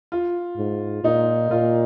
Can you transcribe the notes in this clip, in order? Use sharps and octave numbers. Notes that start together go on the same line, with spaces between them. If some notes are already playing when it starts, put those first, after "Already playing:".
F4
G#2
A#2 D#4
A#2 F4